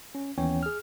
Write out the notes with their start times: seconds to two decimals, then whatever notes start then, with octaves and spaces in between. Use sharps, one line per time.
0.15 C#4
0.38 D#2 E3 B3 C#4 C#5 G5
0.63 G#4 F6